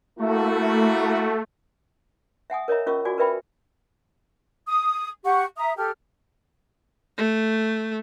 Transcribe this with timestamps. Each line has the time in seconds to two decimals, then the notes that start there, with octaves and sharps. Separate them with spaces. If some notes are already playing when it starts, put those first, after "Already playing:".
0.19 A3 A#3 E4 F#4
2.50 E5 F#5 G#5 D#6
2.68 A#4 C#5 D#5 E5 A#5
2.86 C#4 F4 A#4 D#5 C#6 E6
3.05 F4 F#4 D5 G#5 D6
3.18 A#4 B4 D5 E5 G5 B5
4.68 D#6
5.24 G4 F#5 C#6
5.57 E5 A#5 D#6
5.77 G4 A4 F6
7.18 A3